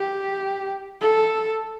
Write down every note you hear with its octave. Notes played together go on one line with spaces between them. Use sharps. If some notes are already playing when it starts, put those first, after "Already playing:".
Already playing: G4
A4